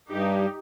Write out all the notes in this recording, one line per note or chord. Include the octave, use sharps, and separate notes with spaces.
G2 D#4 G4